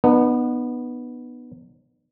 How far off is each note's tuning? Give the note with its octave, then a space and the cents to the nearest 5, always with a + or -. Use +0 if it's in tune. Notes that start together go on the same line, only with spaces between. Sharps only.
B3 -5 D#4 -45